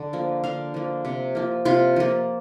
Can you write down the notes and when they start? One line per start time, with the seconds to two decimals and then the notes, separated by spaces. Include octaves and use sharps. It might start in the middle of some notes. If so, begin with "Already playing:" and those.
Already playing: D3
0.13 F3 A#3
0.44 D3 F5
0.74 F3 A#3
1.05 C3
1.35 F3 A#3
1.65 C3 F4
1.96 F3 A#3